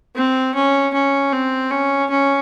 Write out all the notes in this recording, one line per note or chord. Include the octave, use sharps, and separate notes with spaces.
C4
C#4
C#4
C4
C#4
C#4